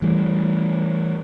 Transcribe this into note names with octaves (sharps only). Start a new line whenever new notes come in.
E3 G3 A3